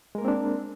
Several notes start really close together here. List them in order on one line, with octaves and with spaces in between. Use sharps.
G#3 A#4 A#3 C4 D4